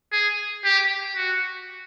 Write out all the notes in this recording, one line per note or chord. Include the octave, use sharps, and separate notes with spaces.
G#4
G4
F#4